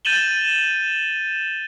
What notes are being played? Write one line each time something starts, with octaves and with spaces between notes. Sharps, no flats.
G6 A6 D#7 E7 F#7 G7